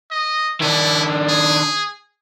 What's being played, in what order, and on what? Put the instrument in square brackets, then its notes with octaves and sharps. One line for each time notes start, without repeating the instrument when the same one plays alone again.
[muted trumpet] D#5
[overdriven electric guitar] D#3 D4 [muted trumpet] E4
[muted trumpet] G#4